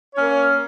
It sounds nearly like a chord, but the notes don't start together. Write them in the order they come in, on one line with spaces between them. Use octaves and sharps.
C#5 C#4 A#3